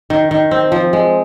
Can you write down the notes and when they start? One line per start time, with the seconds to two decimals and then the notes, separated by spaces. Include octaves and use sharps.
0.10 D#3
0.31 D#3
0.51 C4
0.72 F3
0.93 G#3